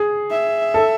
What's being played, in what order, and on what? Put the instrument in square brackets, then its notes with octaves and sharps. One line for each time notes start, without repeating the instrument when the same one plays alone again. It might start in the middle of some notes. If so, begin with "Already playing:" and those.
Already playing: [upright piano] G#4
[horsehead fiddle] E5
[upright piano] A4